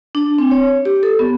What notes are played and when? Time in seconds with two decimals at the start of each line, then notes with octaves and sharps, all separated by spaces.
0.15 D4
0.38 C4
0.51 C#5
0.85 G4
1.03 A4
1.19 B3